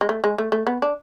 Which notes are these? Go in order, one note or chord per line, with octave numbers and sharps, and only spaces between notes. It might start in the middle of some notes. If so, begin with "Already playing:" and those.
G#3
A3
G#3
A3
A3
B3
D4